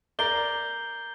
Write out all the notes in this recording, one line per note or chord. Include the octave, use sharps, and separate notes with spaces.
A#4 D5 G6 C7 G7